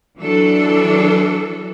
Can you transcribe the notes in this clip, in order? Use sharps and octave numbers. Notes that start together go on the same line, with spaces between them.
E3 F#3 D4 A4